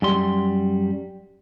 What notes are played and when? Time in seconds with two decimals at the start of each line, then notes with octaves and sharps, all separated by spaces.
0.02 F#2 G3 C6